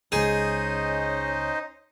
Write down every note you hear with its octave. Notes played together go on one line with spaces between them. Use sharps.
C#2 G#3 C#4 D#4 G#4 C5 D#5